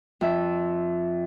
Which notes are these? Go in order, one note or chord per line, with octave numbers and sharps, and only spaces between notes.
F2 E5